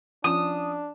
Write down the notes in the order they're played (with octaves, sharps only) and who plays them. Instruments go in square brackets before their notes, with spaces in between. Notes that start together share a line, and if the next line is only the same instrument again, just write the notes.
[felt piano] F3 C#4 E7 [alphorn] D4 [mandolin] D#6